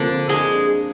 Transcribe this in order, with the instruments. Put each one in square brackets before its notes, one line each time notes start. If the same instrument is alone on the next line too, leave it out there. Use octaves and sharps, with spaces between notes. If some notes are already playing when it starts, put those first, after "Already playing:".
Already playing: [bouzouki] D3 [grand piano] F3 A#3 C4
[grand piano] C4
[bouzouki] G#3 [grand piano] D4
[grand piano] D4